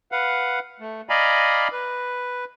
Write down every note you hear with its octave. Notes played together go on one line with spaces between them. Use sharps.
B4 F5 F#5
A3
D5 D#5 F5 G#5 A#5 B5
B4